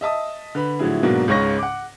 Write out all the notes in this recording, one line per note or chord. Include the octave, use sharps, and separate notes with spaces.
D#5 E5 A5 D#6
D3 B4 B5
A2 D3 F3 F#3 E4 G#4
G#2 B2 F#3 A#3 D4 F#4
C#2 G#2 C#3 C#4 C#6 A#6
F#5 D6